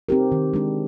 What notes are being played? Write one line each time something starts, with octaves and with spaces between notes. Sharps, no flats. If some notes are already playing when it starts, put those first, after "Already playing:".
C4 D#4 G4 A#4
D#3
G#3 D4